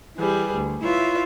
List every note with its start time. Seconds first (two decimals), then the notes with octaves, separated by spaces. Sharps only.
0.17 E3 G3 G#4 B4
0.54 D2
0.83 E4 F4 B4 C#5 E5